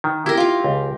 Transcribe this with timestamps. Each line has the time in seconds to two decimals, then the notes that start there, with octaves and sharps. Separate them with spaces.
0.04 D#3
0.26 E4 G4 A#4
0.37 F4 F5
0.64 C#2